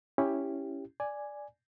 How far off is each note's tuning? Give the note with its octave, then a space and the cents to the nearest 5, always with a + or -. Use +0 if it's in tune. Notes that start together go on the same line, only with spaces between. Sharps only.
C#4 +0 E4 +5 G4 +10
D5 +0 G#5 +0